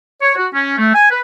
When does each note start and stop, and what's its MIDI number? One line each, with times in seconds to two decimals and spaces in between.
0.21 0.32 73
0.36 0.47 66
0.53 0.75 61
0.78 0.94 57
0.94 1.07 80
1.10 1.20 71